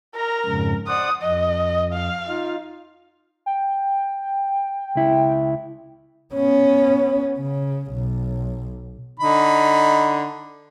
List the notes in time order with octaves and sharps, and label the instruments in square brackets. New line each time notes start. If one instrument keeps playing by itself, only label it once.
[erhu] A#4 [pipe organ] A#5
[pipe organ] F2 G#2 C#3
[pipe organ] C5 D5 F#5 [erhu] D#6
[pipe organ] F2 [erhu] D#5
[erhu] F5
[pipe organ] D#4 F4
[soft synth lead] G5
[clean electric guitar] C#2 E4
[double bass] B3 C#4
C#3
B1
[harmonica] D3 D#4 B5